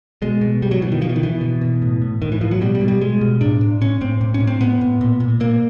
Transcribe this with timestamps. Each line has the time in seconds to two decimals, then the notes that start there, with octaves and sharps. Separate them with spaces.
0.22 B2 G#3
0.41 B2
0.62 B2 G3
0.71 F#3
0.82 B2 E3
0.92 D#3
1.01 B2 F3
1.09 E3
1.16 D#3
1.22 B2 E3
1.41 B2
1.61 B2
1.82 A2
2.02 A2
2.22 A2 D#3
2.32 E3
2.41 A2 F3
2.51 F#3
2.61 B2 G3
2.75 G3
2.81 B2
2.88 G3
3.01 B2 G#3
3.21 B2
3.41 A2 D4
3.61 A2
3.81 A2 C#4
4.01 A2 C4
4.21 A2
4.34 C#4
4.40 A2
4.47 C4
4.60 A2 B3
4.81 A2
5.01 A#2
5.20 A#2
5.40 A#2 A#3